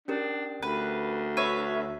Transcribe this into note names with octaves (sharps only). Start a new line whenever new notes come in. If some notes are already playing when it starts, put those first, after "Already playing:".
C#4 D4 G4 A#4
D2 B4
B4 C#5 E5